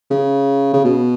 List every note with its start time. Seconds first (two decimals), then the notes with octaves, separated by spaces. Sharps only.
0.11 C#3
0.74 C#3
0.85 B2